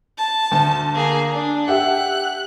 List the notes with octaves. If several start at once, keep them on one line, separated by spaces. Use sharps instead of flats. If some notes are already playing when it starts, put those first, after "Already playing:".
A5
D2
A#3 G#4
D4
G4 E5 F#5 F#6